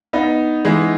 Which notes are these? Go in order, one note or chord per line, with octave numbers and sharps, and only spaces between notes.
B3 D#4
E3 G#3